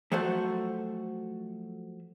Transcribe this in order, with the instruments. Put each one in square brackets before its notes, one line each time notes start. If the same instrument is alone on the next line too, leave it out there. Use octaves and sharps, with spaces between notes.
[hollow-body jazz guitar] F3 F#3 A3 F#4 A4 C5